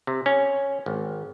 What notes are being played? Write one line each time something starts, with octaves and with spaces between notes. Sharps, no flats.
C3
C#4
G#1